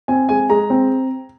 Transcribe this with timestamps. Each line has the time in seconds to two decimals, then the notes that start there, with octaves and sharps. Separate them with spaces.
0.08 C4 G#5
0.29 G#3 G#5
0.50 G#3 A#5
0.70 C4